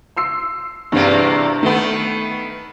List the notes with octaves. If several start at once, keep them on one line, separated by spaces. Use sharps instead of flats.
C6 E6 C7
E2 G2 C3 A#3
D#3 A3 B3